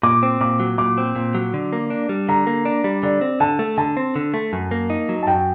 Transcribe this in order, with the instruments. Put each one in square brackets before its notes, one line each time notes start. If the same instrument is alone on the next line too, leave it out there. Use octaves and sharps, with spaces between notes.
[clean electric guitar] A#2 [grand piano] D6
[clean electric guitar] C4
[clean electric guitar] A#2 [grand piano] D6
[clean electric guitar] F#3
[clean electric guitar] A#2 [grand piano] D6
[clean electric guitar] C4
A#2
F#3
D3
A#3
D4
G3
[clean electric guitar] D3 [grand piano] A#5
[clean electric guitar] A#3
D4
G3
[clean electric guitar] D3 [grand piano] D5
[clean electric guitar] C4
[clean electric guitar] D3 [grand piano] A5
[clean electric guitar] A3
[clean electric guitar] D3 [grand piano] A5
[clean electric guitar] C4
D3
A3
F#2
A#3
D#4
F#3
[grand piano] A5
[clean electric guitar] F#2 [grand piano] G5